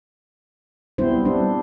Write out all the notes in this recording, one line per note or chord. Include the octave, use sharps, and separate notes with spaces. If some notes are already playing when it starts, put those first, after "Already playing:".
G3 B3 C4 E4 C5
G3 D4